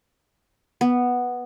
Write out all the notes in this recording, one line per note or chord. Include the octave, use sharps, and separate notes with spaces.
B3